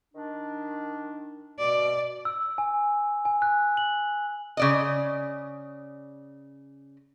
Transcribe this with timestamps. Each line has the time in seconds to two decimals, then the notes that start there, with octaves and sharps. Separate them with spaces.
0.14 D#3 D4
1.59 B2 D5
2.25 E6
2.58 G#5
3.25 G#5
3.42 F#6
3.77 F#7
4.57 C#3 D5 D#5